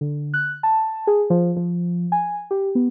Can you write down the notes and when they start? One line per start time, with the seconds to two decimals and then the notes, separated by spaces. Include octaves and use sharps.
0.01 D3
0.34 F#6
0.63 A5
1.07 G#4
1.30 F3
1.57 F3
2.12 G#5
2.51 G4
2.75 B3